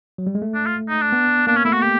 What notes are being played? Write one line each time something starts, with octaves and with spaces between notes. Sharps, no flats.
F#3
G3
G#3
A3
D4
F4
D#4
D4
B3
A#3 D4
C#4
A3 E4
F#4
G4